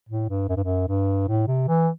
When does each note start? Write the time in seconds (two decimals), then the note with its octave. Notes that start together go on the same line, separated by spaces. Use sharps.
0.09 A2
0.29 G2
0.49 F#2
0.56 G2
0.64 F#2
0.88 G2
1.28 A2
1.47 C3
1.68 E3